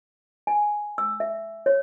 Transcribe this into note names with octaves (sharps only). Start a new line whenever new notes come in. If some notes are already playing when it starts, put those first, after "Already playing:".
G#5
E6
E5
C#5